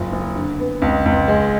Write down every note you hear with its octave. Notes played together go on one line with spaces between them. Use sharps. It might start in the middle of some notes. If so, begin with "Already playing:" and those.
Already playing: F#1 F4
F#1
D3
B3
C#2
C#2
G#3